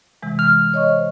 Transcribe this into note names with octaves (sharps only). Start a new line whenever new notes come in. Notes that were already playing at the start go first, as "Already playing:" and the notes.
C3 E3 G#3
F6
C#5 D#5 C#6
C5